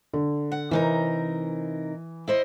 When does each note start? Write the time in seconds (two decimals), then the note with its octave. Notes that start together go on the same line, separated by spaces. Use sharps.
0.14 D3
0.52 F#5
0.71 C3 E3 D#4 A#4
2.28 E4 C5 D#5